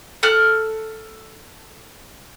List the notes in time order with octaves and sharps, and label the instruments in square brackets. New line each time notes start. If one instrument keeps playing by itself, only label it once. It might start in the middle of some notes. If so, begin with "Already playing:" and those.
[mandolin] A4 F6 F#6